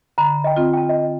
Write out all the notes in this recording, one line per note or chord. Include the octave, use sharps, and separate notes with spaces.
D3 A#5 B5
D#5 G5
C4 F4
G5 A5
D#5